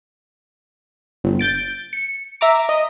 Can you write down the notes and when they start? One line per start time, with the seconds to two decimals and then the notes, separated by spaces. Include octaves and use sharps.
1.24 G1
1.39 G6 A6 D7
1.93 C#7
2.41 E5 A#5 D6
2.69 D#5